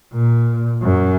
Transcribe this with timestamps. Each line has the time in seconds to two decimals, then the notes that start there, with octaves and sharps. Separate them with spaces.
0.14 A#2
0.83 F#2